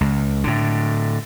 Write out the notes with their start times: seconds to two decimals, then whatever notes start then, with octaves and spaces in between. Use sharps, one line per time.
0.01 C#2
0.44 A2 D3